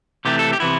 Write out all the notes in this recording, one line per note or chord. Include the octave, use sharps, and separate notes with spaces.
C3 E3 A3 C4 G4
A4
G4
C3 E3 B3 E4